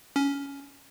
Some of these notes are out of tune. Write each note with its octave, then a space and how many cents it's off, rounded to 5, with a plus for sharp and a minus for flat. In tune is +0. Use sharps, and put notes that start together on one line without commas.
C#4 +15